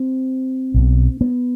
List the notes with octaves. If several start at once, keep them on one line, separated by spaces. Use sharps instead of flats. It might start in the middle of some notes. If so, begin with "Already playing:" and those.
Already playing: C4
B1 B2
B3